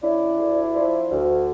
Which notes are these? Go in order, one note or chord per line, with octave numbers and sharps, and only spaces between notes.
C#3 D4 E4
D2
F3
D2